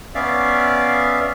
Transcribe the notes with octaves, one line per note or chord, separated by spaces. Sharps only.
B3 C#4 D5 E5 F5